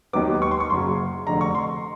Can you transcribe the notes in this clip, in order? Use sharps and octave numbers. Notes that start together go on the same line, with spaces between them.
D#2 D#3 F#3 B3 D6
C#6
C6
C#6
F#1 F#2 C#3 F#3 C6
F1 F2 D3 A#5
C#6
C6